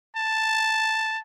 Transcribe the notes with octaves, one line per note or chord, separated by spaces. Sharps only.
A5